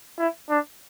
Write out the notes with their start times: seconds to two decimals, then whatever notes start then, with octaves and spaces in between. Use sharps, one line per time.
0.18 E4
0.50 D4